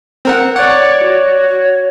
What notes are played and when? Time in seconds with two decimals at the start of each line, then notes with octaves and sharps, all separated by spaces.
0.25 C4 A#4 F#5
0.55 C#5 D5 F#5
1.04 F#4 C#5